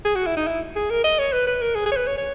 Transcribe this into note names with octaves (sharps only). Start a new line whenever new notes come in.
G#4
F#4
E4
D#4
E4
G#4
A#4
D#5
C#5
B4
B4
A#4
G#4
G#4
C#5
B4
C#5
C#5